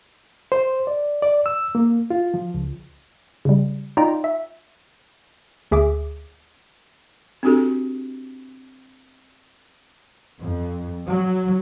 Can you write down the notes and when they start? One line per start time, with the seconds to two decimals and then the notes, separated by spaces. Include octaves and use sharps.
0.52 C5
0.87 D5
1.22 D5
1.46 E6
1.75 A#3
2.10 F4
2.34 F3
2.54 C#2
3.45 C#3 G3
3.97 D#4 F4 D5 G5 A#5
4.24 E5
5.71 D2 G#4 E5 D6
7.43 C4 D4 F#4 G4 A4
10.40 F2
11.07 F#3